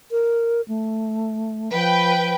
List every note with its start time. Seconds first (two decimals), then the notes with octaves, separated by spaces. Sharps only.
0.11 A#4
0.68 A3
1.73 F3 B4 G5